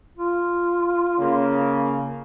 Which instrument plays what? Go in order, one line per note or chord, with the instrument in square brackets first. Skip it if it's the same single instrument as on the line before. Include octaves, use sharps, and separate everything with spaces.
[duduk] F4
[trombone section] C#3 A#3